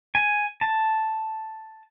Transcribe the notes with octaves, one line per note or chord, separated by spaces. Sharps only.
G#5
A5